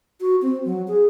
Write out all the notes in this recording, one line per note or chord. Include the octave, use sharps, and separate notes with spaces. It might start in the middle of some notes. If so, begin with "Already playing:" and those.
F#4
C4
F#3
G#4